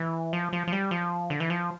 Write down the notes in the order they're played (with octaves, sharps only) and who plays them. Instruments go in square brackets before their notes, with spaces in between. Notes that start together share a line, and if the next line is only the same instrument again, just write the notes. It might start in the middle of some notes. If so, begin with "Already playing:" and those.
Already playing: [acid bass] E3
F3
F3
F3
G3
F3
D3
E3
F3